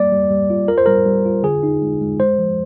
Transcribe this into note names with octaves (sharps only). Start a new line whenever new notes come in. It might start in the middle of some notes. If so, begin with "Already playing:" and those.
Already playing: G3 A#3 D5
G3
G3
F4
F4 A#4
C5
G3 A#4
G3
F4
D3 G#4
D#4
G#3
G#3
G#3 C5
F3